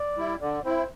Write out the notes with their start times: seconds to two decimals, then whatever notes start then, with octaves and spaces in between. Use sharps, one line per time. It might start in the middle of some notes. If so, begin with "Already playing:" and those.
Already playing: D5
0.16 G3 E4
0.40 D3 D5
0.64 C4 E4 C5